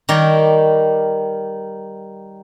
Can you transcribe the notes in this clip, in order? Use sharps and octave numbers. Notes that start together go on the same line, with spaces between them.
D#3 G3 A#4 C#5 D5